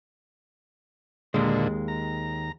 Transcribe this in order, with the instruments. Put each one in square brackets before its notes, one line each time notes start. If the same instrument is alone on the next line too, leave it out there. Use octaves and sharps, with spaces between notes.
[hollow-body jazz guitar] D#2 G#3 [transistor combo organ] A#2 D3
[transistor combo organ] A#5